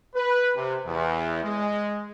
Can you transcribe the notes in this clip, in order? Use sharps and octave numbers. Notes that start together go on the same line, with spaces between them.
B4
C3
E2
G#3